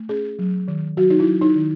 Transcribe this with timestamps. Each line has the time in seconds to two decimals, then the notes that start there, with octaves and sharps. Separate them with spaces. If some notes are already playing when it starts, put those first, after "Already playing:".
Already playing: A3
0.09 C#4 G#4
0.39 F#3
0.68 D#3
0.97 F#3 F#4
1.10 D#4
1.20 E4
1.26 F#3
1.41 D#4
1.56 D#3